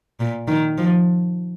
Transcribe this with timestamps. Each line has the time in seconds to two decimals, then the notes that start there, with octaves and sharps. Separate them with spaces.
0.20 A#2
0.48 D#3
0.78 F3